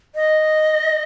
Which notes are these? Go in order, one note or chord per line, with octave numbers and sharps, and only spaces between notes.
D#5